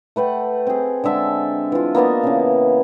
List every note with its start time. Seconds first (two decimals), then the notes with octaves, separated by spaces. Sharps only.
0.16 A3 B4 F#5 G5
0.67 C4 G#4
1.04 D3 G#3 E5 A5
1.72 E3 F4
1.95 A#3 B3 D4 D#5
2.23 C#3 E3